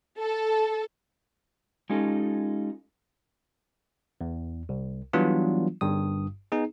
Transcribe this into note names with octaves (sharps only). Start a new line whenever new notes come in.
A4
G#3 C#4 D#4 F4 G4 A4
E2
C2
E3 F#3 G3 B3 D4 F4
G1 G2 D#6
B3 D#4 G#4